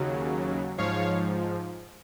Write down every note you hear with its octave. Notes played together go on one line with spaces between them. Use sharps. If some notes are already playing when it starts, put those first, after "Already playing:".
Already playing: D#2 C#3 F#3
G#2 F3 C#5 F5